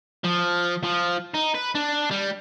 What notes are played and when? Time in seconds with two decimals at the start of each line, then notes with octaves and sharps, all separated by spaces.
0.24 F3
0.83 F3
1.34 D#4
1.55 B4
1.75 D4
2.11 G3